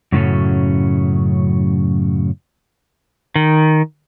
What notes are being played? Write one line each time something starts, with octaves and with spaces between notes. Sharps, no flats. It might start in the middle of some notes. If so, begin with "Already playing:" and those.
F#2 A2 C#3 F#3 A3 C#4
D#3